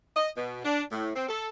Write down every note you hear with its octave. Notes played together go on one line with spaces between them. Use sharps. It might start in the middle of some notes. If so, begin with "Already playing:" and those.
D#5
B2
D4
A2
C4
A4